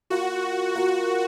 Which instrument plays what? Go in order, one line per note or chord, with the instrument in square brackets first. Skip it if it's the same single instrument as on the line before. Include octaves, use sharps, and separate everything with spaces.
[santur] A#3 F4 A#4 [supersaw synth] F#4
[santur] A#3 F4 A#4 [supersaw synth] F#4